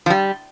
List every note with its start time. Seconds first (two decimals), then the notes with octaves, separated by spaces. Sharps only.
0.06 F3
0.10 G3